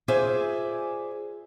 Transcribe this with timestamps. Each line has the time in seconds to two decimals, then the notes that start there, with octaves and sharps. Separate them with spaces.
0.08 F4 G#4 C5 D5 E5 G#5